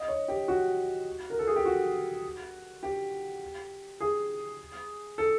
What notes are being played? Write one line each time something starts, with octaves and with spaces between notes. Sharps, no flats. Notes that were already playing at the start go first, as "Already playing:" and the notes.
Already playing: D#5
C#5
G4
F#4
A#4
A4
G#4
G4
F#4
G4
G#4
A4